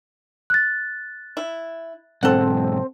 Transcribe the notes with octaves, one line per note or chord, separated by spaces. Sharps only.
F#6 A6
E4
B1 G#2 C4 A4 F#5